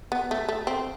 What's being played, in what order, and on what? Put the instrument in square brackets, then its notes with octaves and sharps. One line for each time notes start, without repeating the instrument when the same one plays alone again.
[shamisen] B3
A3
A3
C4